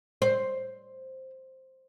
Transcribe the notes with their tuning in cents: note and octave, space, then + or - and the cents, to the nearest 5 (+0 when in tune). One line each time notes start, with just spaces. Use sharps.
C5 +5